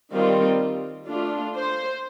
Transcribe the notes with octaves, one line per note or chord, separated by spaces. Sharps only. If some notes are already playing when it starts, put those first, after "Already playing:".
D#3 G3 C4 F4
A3 D4 F4
C5